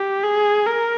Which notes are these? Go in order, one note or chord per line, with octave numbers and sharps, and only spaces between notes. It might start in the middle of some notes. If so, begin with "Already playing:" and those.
Already playing: G4
G#4
A#4